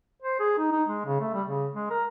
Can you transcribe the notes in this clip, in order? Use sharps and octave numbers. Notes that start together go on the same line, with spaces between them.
C5
G#4
D#4
D#4
G#3
C#3
A3
G3
C#3
G#3
A#4